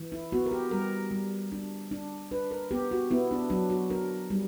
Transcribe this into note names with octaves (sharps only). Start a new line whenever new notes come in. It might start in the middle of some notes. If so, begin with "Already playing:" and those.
Already playing: E3
E4
B3 F#4
A#4
G4
G3 A#4
G3
D4
D4
D4 B4
A#4
B3 G4
F#4
B3 E4
D4
F#3 D4
F#4
D4 A#4
G3